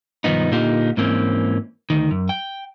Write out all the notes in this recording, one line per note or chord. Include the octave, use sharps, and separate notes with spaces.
B1 G2 D#3 F3 B3 D#4
A#2 D3 A#3 D#4 F4 G4
G#2 E3 A#3 C4 C#4
D2 D#3
F#2
G5